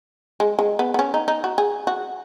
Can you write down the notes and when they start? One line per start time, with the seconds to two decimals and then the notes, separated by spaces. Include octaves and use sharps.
0.40 G#3
0.59 G#3
0.79 B3
0.94 B3
0.99 C#4
1.14 D#4
1.28 D#4
1.44 F#4
1.58 G#4
1.87 F#4